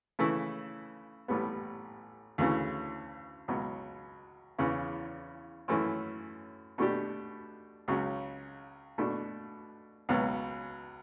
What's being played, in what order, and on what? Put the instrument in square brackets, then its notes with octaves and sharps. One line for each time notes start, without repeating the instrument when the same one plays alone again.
[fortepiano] C#3 E3 A3 E4
A1 A2 G3 B3
D2 C#3 E3
C#2 B2 F#3
E2 C#3 E3
F#2 E3 A3 C#4 E4
B2 A3 D4 G4
C#2 C#3 F#3
B2 A3 D4
C#2 B2 F#3 B3